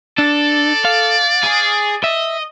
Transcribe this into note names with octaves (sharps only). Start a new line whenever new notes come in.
D4 A4 D5
F5
G#4
D#5 E5